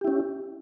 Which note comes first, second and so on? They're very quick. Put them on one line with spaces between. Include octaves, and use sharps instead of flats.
G4 E4 C#4